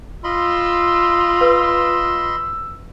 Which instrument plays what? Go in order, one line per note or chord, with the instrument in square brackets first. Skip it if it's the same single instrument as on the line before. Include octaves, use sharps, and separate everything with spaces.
[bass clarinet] F4 [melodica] D#5 B5 C6 [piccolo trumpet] E6
[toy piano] B4